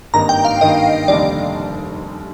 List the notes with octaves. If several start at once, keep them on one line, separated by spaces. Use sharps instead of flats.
G#1 G2 D#3 A#3 D#4 A#5
G5
F5
G#1 G2 D#3 A#3 D#4 D#5
F1 D#2 D3 G3 D5